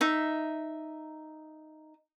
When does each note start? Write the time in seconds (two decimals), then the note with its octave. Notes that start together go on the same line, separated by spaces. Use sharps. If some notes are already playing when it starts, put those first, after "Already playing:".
0.01 D#4 E5